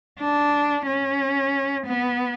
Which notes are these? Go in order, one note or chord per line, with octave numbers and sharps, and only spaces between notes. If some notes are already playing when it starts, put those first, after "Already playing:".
D4
C#4
B3